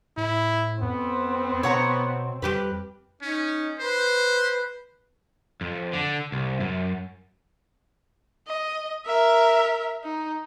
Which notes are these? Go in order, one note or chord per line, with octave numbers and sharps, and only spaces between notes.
A2 E4
F2 B3 C4
B2 C#5 F#5 A#5
F2 G3 G4 B4
C#4 D#4
B4 C5
F2
D3
C2
F#2
D#5
A#4 E5
D#4